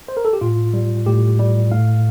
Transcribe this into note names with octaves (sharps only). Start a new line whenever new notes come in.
C5
A#4
A4
G4
A2 F4
G3
A2 G4
G3
A2 F5